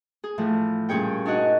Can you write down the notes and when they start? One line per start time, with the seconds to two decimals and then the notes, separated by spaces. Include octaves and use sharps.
0.24 G#4
0.38 A2 E3 F3 A3
0.89 G2 A#2 C#4 G#4 C#5 G5
1.26 D4 D#4 F#4 C#5 D#5 F#5